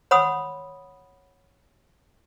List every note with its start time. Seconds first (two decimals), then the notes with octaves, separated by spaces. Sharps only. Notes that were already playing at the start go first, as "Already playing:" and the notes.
0.11 C#5 F#5 B5 C6 D#6 E6